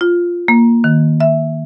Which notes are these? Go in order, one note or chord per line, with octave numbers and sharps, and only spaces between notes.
F4
A#3
D#3
E5